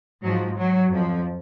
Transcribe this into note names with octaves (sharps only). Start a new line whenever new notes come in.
G#2 F3 F#3
F#3
F2 F3